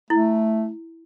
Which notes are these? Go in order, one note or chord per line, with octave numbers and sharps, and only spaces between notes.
A3 E4